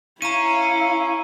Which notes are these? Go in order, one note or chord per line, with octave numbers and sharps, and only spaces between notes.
C#4 E4 F5 A#5 D#7